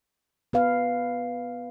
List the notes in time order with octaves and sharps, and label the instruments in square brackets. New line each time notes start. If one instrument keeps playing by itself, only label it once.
[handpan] B3 B4 F5